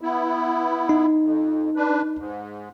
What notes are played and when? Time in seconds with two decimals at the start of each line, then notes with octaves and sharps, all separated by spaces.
0.01 B3 E4
0.89 D#4
1.21 F2
1.76 D4 B4
2.17 G#2